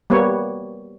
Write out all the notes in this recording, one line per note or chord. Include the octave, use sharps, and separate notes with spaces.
G3 A#3 B3 C#5